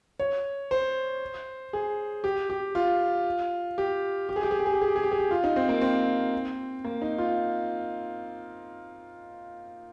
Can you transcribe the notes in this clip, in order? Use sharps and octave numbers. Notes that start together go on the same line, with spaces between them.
C#5
C5
G#4
G4
G4
F4
G4
G4
G#4
G4
G#4
G4
G#4
G4
G#4
G4
G#4
G4
G#4
G4
F4
D#4
C4
A#3
C4
A#3
D#4
F4